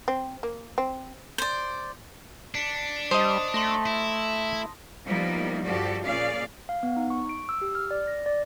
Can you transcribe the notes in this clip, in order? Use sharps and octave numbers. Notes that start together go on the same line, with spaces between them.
C4
A#3
C4
C5 D5
D4 B6 C#7
G3 C5 D#5 A5 D#6 F7
A3 C6 A#6
E4
F3 G3 A#3 B3 D#4 E4
G2 F3 F#4 G4 A4 D5
A#2 C#4 G#4 D5 F5
F5
B3
D#4
C#6
D7
E6
G4
F6
D5
A#6
D5